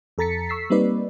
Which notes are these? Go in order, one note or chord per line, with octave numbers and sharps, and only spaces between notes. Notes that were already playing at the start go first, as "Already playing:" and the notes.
F2 A4 A#5 A6 B6 C#7
C#6 E6 B6 C7
G3 A#3 C4 D#4 B4 D5